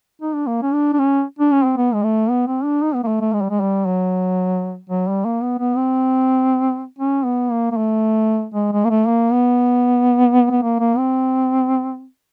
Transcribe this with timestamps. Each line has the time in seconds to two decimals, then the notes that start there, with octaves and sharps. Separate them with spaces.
0.22 D#4
0.34 D4
0.47 A#3
0.62 C#4
0.73 D4
0.93 D4
0.99 C#4
1.39 D4
1.52 C#4
1.64 C4
1.77 B3
1.94 G#3
2.03 A3
2.30 B3
2.47 C4
2.64 D4
2.82 D#4
2.95 B3
3.04 A#3
3.08 A3
3.21 A3
3.33 G#3
3.42 G3
3.50 G#3
3.61 G3
3.86 F#3
4.90 F#3
5.08 G3
5.25 A#3
5.42 B3
5.59 B3
5.77 C4
6.99 C#4
7.25 B3
7.51 A#3
7.72 A#3
7.77 A3
8.54 G#3
8.72 G#3
8.85 A#3
8.90 A3
9.07 A#3
9.32 B3
10.51 B3
10.63 A#3
10.80 A#3
10.97 C4